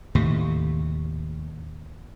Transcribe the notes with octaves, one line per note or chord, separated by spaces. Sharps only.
D#2 A2 C3